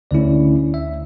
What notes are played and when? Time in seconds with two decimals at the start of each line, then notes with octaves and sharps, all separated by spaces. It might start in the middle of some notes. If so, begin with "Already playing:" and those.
0.11 D2 D3 A3 C#4 E4 D5
0.74 E5